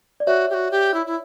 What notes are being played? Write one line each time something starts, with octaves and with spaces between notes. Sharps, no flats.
D5
F#4 C#5 E5
G4
F#4
G4
E4
E4